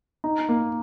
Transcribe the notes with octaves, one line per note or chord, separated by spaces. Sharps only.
D#4
A#3